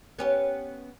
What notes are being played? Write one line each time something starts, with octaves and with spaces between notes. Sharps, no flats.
B3 C#4 G4